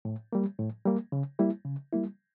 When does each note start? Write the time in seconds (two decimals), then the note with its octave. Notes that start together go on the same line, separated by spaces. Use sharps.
0.05 A2
0.33 G3 A#3
0.59 A2
0.85 G3 A#3
1.12 C#3
1.39 G3 A#3 E4
1.65 C#3
1.92 G3 A#3 E4